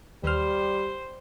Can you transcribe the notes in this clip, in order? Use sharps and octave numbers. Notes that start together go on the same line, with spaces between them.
D#2 G3 C5 F6